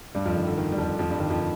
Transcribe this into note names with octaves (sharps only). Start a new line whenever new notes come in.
G2 G3
F2 F3
D#3
D3
D#3
G3
F2 F3
F2 F3
G2 G3
D#3
F2 F3
D#3